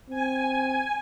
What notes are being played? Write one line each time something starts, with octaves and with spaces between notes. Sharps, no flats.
C4 G#5